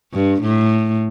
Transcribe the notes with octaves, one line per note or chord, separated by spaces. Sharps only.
G2
A2